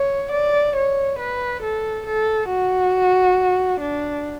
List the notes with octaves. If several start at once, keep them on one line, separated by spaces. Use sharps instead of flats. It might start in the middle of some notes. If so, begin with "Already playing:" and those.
Already playing: C#5
D5
C#5
B4
A4
A4
F#4
D4